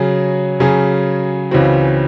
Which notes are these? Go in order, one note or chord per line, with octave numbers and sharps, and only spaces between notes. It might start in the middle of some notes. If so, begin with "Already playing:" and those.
Already playing: C#3 F#3 C#4 G#4
C#3 F#3 C#4 G#4
C#2 C#3 E3 C4 F#4